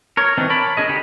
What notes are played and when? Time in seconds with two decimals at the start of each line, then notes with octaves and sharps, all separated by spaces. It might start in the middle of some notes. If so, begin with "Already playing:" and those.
0.17 A#4 C#5
0.38 E3 C4 D4 D#4
0.50 A#4 C#5 D5 A5 B5
0.77 D4 G#4 D#5
0.89 D3 D4 D#4 G4 B5